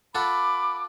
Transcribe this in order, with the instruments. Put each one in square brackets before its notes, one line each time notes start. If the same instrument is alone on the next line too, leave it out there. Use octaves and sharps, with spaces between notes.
[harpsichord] F4 A4 F#5 [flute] B5 [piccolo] D6